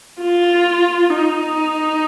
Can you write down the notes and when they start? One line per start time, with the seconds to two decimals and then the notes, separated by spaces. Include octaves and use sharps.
0.21 F4
1.10 D#4